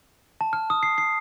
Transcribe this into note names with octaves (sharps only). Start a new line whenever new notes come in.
A5
F6
D#6
C7
C7